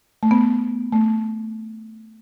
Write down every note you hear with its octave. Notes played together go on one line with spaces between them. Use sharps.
A3
B3
A3